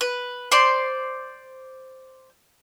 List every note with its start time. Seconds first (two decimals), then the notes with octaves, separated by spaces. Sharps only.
0.01 B4
0.52 C5 D5 C6